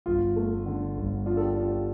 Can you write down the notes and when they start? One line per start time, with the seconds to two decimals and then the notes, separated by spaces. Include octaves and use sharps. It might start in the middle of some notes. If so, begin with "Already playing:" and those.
0.06 G1 F4
0.36 A3
0.66 D3
0.97 G1
1.26 D4 F4
1.37 A4
1.42 G4
1.56 D4 F4
1.71 G4